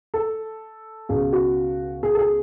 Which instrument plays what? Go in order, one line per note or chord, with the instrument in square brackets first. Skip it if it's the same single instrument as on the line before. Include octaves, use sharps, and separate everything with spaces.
[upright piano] A4
C#2 B2 G#4
F#4
G#4
A4
G#4